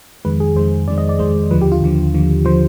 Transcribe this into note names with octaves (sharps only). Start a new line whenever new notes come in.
F2 D#3 G#3 B4
G#4
F2 D#3 G#3 C5
F2 D#3 G#3 D5
D#5
D5
F2 D#3 G#3 C5
D#2 D3 F3 B4
G4
F4
D#2 D3 F3
D#2 D3 F3
D3 F3 C5